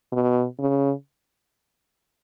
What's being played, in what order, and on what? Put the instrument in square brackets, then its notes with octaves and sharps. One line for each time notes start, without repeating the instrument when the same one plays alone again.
[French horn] B2
C#3